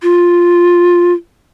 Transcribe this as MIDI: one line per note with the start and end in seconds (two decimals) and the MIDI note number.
0.03 1.12 65